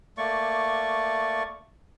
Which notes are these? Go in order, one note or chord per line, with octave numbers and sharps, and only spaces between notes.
A3 A#3 D5 C#6